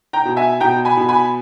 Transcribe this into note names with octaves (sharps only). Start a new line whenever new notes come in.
G5 A#5
B2
E5 G#5
B2 G5 A#5
G#5 B5
B2
G#5 B5